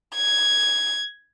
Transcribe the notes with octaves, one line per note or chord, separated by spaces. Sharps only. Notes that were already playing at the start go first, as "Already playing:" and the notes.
G#6